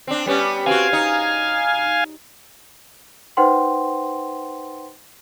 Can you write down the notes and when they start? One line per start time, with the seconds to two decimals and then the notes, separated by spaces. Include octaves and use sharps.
0.07 C4 D4
0.26 G3 B3 C#4
0.66 C4 F#4 F5 G#5
0.93 D#4
3.37 D#4 B4 C5 F#5 G5 C6